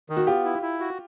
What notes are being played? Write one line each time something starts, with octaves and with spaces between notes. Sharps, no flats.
D#3
F#4
B3 F4 G4
E4
E4
F#4